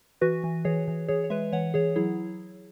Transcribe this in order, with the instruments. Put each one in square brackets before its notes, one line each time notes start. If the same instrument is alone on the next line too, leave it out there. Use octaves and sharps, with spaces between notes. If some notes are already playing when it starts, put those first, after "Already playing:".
[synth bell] E3 F#4 B4
E3
E3 G#4 C#5
E3
E3 G#4 C#5
C#5
G#3 B4 E5
E3 C#5 F#5
E3 G#4 C#5
F#3 E4 G#4